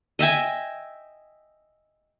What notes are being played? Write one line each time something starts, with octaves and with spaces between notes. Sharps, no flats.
D#5 E5 G5 G#5